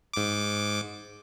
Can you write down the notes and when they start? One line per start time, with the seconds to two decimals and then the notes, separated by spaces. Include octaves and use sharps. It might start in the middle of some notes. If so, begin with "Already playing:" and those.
0.13 G#2 D6